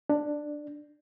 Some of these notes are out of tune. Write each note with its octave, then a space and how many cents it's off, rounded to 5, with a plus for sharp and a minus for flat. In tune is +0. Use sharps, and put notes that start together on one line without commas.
D4 +10